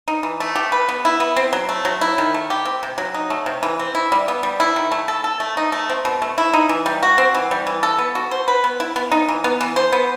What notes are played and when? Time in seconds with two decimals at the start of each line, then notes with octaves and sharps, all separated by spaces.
0.08 D#4
0.23 E3
0.40 A3
0.55 G4
0.72 B4
0.89 B3
1.05 E4
1.20 B3
1.36 C4
1.53 F#3
1.69 A3
1.85 F#3
2.01 E4
2.18 D#3
2.34 A3
2.50 G4
2.65 C4
2.83 C3
2.98 F#3
3.14 D#4
3.30 A3
3.46 C3
3.63 E3
3.79 C4
3.95 E4
4.12 G3
4.28 B3
4.43 G3
4.60 E4
4.76 D#3
4.92 A3
5.08 A4
5.24 A4
5.40 A3
5.57 D#4
5.72 A3
5.90 C4
6.05 B2
6.22 A3
6.38 E4
6.54 D#4
6.69 E3
6.86 G3
7.03 F#4
7.18 C4
7.35 E3
7.51 G3
7.67 E3
7.83 A4
7.98 B3
8.15 F#4
8.31 C5
8.48 B4
8.64 B3
8.80 E4
8.96 B3
9.12 D#4
9.28 E3
9.44 B3
9.61 E3
9.76 C5
9.92 B3